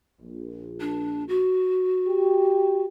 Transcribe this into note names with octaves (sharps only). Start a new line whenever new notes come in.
A#1
D4
F#4
G4